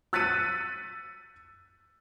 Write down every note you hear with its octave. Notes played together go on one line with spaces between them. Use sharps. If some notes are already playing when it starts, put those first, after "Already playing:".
E6 F#6 A6 B6 C#7 D#7